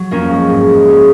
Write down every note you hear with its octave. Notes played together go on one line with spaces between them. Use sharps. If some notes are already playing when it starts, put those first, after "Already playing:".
Already playing: F#3
F2 A#3 C#4
G#3
G#2
G#3
F#2